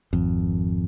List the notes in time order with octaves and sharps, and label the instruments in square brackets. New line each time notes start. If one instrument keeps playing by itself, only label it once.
[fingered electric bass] G#1 F2